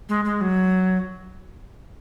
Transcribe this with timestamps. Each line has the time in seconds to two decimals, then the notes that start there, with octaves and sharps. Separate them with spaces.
0.09 G#3
0.25 G#3
0.41 F#3